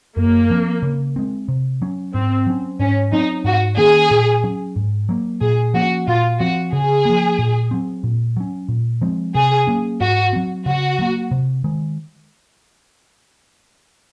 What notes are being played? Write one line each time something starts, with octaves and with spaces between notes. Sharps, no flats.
F#2 A#3
F3 C4
C#3
G#3 C4
C3
F#3 C#4
G#2 C4
F#3 C#4
G#2 C#4
F#3 C4 D#4
G#2 F#4
D#3 A#3 C#4 G#4
A#2
F#3 C#4
G#2
F#3 A#3
A#2 G#4
F3 A#3 C#4 F#4
A#2 F4
F3 C4 F#4
C#3 G#4
F3 A#3
A#2
F#3 C4
A#2
F#3 C#4
A#2
F3 G#3 C4
C3 G#4
F#3 A#3 C#4
G#2 F#4
F#3 C4
C#3 F#4
F#3 A#3
C3
D#3 G#3